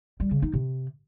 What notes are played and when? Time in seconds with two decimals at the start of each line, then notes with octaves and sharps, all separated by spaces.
0.20 G3
0.31 C#3
0.42 D#4
0.53 C3